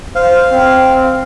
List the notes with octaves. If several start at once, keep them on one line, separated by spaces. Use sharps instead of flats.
C5 F5
C4